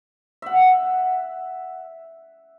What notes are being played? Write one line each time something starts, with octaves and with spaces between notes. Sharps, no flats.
E5 F#5